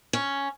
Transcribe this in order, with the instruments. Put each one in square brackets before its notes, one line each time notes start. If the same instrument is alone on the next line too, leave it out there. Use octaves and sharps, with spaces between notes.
[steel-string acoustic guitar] C#4